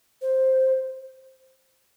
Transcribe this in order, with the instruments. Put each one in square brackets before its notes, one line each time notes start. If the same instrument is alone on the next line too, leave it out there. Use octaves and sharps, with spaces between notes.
[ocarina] C5